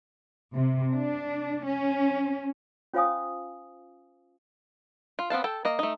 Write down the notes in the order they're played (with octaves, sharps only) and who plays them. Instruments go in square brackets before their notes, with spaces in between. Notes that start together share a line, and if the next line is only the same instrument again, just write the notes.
[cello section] C3
D4
C#4
[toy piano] C#4 F4 C5 F5 G#5 D#6
[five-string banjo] F4
B3 C4 F5 A5
A4 G5 A5
A#3 D#5
A3 D#4